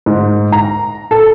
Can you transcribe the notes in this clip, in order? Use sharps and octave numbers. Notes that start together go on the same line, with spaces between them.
G#2
A#5
A4